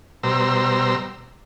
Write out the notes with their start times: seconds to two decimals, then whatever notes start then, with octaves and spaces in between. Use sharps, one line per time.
0.23 B2 G3 C5 A#5 E6